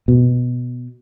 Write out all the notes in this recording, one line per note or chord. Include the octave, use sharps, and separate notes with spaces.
B2